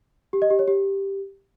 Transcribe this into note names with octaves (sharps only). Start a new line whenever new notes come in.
G4
D#5
G4
C#5
G4